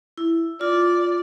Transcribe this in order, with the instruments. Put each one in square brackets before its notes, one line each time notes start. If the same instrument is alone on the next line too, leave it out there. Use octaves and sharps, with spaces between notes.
[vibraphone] E4
[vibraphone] F4 [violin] D5